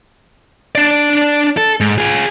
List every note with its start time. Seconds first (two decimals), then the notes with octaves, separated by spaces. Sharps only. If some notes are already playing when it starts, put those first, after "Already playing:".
0.75 D4 D5
1.57 A4
1.80 G#2
1.98 F4 G#4